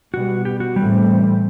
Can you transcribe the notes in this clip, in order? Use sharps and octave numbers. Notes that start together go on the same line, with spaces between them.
B2 G3 B3 F#4
G4
F#4
A2 E3 G3 A3 C4